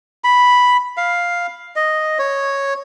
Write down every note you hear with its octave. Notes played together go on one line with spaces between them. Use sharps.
B5
F5
D#5
C#5